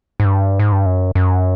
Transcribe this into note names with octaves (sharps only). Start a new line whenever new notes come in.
G#2
G2
G#2
G2
F#2
F#2